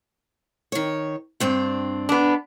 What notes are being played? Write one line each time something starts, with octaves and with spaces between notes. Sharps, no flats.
D#3 C#5
G2 C4 D4
B3 D4